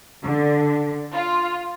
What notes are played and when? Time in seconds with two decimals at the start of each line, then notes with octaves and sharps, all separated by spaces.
0.24 D3
1.13 F4